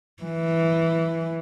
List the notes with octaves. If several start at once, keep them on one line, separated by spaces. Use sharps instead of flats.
E3